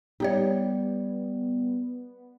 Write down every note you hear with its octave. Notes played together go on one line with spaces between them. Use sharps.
G3 B3 D#4 G4 C#5